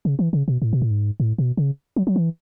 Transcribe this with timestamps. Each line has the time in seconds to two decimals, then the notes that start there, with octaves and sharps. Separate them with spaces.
0.05 C#3
0.19 E3
0.33 C#3
0.48 B2
0.62 A2
0.73 B2
0.82 A2
0.91 G#2
1.20 A2
1.38 B2
1.57 C#3
1.96 F#3
2.07 F#3
2.16 E3